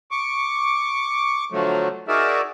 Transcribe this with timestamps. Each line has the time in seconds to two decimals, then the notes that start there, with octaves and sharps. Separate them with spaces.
0.11 C#6 D6
1.52 D3 F3 F#3 A3
2.08 D#4 F#4 G#4 A#4 D5 E5